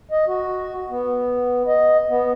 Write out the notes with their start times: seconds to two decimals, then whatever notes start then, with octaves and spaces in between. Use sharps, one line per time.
0.11 D#5
0.28 F#4
0.90 B3
1.67 D#5
2.09 B3